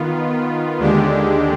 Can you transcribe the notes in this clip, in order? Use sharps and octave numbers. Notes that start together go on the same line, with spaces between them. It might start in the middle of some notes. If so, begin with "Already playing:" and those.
Already playing: D#3 B3 F4
D#2 D3 G#3 D4 G4